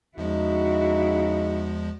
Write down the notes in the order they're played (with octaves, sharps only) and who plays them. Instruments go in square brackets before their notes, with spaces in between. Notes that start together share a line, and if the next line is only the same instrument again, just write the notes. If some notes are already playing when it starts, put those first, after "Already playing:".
[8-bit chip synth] E2 F3 G#3 [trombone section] C#3 D#4 [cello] E4 F#4